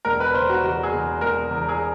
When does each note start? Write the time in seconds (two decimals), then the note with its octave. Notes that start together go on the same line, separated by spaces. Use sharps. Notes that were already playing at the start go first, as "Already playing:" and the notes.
0.05 E1 A#4
0.20 B4
0.34 E1 C5
0.49 F#4
0.63 E2 F#4
0.83 G#4
0.92 E2
1.21 E1 A#4
1.50 E2
1.69 G#4